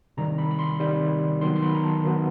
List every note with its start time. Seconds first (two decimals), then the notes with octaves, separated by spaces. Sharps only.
0.17 C3 D#3 G3 A#5
0.38 B5
0.51 B5
0.59 C6
0.80 C3 D#3 G3
1.41 D#3 F#3 B3 C6
1.56 C6
1.63 B5
1.74 A#5
1.84 A5
2.04 D#3 F#3 B3